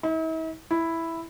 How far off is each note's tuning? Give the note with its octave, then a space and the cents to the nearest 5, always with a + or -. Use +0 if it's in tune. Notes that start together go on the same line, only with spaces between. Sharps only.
E4 -45
E4 +0